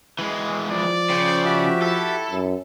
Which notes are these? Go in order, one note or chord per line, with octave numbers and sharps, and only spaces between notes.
E3 G#3
F3 D5
C#3 C5 G5
F#4 G4 E5
E4 A4
F#2